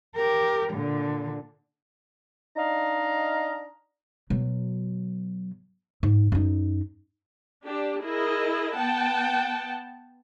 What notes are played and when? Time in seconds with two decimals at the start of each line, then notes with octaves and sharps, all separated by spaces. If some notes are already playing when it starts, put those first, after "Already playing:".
0.16 G4 A#4
0.73 A#2 D3
2.56 D4 D#4 D#5 F5 A#5
4.30 B2 F#3
6.03 G#2
6.32 F#2 D#4
7.64 D4 G4
8.02 E4 G#4 A#4 D#5
8.76 B3 F#5 G5 A5